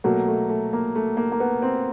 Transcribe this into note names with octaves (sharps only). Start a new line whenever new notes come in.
B2 F#3 A3 A#3
A3
A3
A#3
A3
A#3
A#3
B3
C4